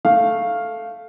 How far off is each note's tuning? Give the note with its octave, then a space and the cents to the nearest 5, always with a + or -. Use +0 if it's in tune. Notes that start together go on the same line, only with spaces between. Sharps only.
A3 +0 F5 +0